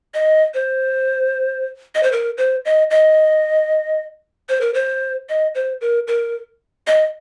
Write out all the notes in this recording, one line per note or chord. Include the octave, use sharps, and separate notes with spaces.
D#5
C5
D#5
C5
A#4
C5
D#5
D#5
C5
A#4
C5
D#5
C5
A#4
A#4
D#5